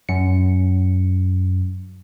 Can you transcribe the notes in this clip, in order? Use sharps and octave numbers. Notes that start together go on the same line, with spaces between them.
F#2 C#7